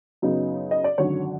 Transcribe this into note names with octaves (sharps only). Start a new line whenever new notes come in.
F#2 C#3 F#3 B3 D#4
D#5
D5
G#1 F#2 D3 F#3 C#5